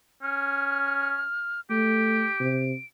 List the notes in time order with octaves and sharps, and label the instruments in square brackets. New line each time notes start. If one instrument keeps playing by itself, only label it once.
[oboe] C#4 [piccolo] F6
[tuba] A3 [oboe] G4 [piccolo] D7
[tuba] C3